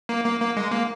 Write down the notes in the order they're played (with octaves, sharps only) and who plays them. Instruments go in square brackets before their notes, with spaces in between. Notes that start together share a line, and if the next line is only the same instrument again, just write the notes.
[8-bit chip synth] A#3
A#3
A#3
G#3
A#3